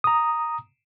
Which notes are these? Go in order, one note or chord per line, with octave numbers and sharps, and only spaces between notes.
A#5 D#6